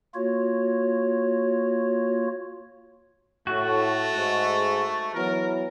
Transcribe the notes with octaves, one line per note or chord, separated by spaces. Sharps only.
A#3 F4 F#4 C#5
A2 A3 F#4
G#2
E3 F#3 B3 A#4